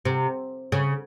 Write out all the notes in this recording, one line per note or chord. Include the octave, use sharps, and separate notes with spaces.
C3
C#3